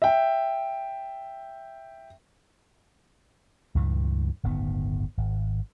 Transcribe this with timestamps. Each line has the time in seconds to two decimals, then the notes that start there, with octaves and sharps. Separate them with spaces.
0.02 E5 G5
3.75 C#2 G2 A#2 E3
4.43 D1 G1 D#3 B3
5.17 G#1